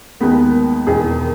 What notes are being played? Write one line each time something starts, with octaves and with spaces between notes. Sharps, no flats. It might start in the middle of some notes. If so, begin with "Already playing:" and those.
D#2 D#3 G#3 B3
E1 E2 D#3 G#4